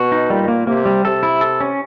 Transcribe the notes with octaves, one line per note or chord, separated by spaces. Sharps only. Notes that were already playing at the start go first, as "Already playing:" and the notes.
Already playing: B2 F#4
D#4
A#2 G3
A#3
C3 A#3
G3
C3 A4
E4
A4
C#4